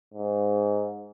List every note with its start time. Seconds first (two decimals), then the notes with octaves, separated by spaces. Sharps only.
0.14 G#2